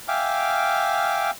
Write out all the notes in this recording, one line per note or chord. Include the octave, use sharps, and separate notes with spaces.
E5 F5 G5 G#5 D6 F6